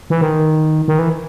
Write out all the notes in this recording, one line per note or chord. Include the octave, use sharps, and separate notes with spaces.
E3
D#3
D#3
E3